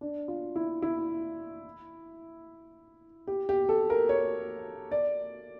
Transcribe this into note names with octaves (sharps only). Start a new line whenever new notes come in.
D4
F4
E4
E4
G4
G4
A4
A#4
C#5
D5